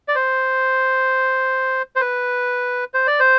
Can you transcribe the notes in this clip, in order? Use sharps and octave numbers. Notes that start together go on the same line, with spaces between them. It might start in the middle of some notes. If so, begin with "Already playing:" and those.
D5
C5
C5
B4
C5
D5
C5